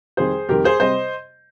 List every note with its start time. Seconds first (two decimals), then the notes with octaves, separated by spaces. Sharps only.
0.17 F2 D#3 G3 G#4 C5
0.49 F2 D#3 G3 G4 A#4
0.64 G#4 C5
0.80 C3 G3 C5 D#5